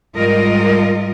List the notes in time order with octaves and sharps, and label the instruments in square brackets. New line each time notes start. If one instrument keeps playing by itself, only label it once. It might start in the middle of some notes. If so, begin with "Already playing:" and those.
[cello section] G#2 G3 F4 A#4 D#5